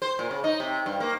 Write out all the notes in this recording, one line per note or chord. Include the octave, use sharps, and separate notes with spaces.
C5
A#2
C#3
D#4
C3
G2
A#3